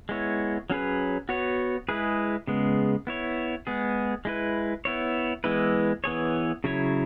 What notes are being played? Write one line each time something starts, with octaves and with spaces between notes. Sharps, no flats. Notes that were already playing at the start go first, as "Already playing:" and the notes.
G#3 B3 E4 C#5
F#3 C#4 G#4 B4
B3 F#4 C#5
G#3 E4 G#4 B4
C#3 G#3 B3
B3 E4 C#5
G#3 B3 G#4
G#3 E4 B4
B3 E4 C#5
E3 G#3 B3 E4 B4
E3 B3 G#4 C#5
C#3 F#3 E4 C#5